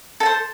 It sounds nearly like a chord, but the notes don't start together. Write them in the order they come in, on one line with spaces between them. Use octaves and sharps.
A4 A5 C5